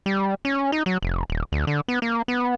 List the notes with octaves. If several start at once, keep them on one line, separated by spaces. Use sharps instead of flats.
G3
C#4
D#4
F#3
F1
D#1
D2
D3
B3
A#3
B3